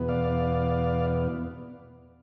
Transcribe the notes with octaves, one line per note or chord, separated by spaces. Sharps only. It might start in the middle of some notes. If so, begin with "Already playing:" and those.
Already playing: E2 B2 B3
D5 F5